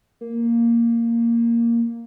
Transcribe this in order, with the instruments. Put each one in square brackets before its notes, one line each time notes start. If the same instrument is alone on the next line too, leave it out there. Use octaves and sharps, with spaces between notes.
[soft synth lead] A#3